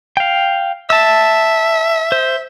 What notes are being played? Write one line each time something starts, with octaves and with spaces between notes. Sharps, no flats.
F5 G5
E5 A5 E6
C5